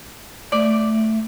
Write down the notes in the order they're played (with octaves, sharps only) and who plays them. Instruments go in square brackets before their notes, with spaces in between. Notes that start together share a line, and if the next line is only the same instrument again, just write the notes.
[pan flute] A3 [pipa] D5